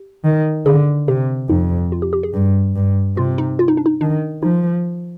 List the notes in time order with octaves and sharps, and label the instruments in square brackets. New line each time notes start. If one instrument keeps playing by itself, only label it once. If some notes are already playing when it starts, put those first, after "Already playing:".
Already playing: [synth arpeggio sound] G4
[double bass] D#3
[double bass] D3 [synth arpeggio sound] G#4
[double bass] C3 [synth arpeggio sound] G4
[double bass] F2 [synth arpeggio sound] D#4
[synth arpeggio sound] F4
G4
G4
G#4
[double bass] G2
G2
[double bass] C3 [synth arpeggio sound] F4
[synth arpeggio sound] D#4
F4
D#4
D4
D#4
[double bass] D#3 [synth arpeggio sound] D4
[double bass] F3 [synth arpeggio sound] D#4